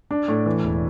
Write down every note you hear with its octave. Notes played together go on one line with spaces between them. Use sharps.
D4
A2
E3
E1